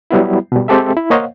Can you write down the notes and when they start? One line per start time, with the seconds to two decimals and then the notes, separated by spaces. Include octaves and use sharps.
0.11 F#3 G3 B3 E4
0.52 B2 G3
0.68 G#3 C4 G4 A4 E5
0.97 E4
1.10 A#3 C5 C#5 D#5 F5 F#5